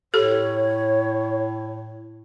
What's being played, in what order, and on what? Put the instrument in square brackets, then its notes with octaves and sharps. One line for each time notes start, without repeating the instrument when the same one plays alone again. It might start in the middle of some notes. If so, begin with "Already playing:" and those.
[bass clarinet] A2 [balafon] G4 A4 [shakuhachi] C#5